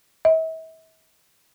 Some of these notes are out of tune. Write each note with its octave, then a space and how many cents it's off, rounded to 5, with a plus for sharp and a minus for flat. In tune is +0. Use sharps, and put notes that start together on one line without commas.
E5 -40